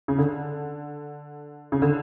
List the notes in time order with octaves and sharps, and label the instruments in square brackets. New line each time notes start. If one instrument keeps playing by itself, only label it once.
[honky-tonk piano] C#3
D3
C#3
D3